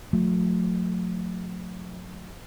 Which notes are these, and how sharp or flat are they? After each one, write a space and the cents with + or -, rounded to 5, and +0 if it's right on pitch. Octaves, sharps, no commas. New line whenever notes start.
F#3 -45 A3 +0